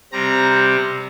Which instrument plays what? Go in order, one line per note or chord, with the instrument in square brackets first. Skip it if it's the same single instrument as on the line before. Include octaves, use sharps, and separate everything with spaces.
[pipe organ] C3 G3 C4 A#5